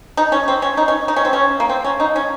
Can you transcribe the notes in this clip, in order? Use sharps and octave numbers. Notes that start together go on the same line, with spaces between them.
D#4
C#4
C4
C#4
D#4
C#4
D#4
C#4
C4
C#4
A#3
C4
C#4
D#4
C#4